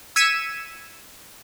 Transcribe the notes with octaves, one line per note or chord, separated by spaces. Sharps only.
E6 G#6 B6 C#7 D#7 E7